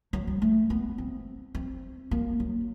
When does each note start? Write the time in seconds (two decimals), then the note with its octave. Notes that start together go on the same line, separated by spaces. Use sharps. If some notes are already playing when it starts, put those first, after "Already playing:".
0.13 F#3
0.27 G3
0.42 A3
0.70 B3
0.98 C4
1.55 C4
2.11 A#3
2.40 F#3